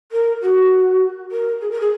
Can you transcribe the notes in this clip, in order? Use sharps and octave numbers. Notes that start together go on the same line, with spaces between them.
A#4
F#4
A#4
G#4
A#4
G#4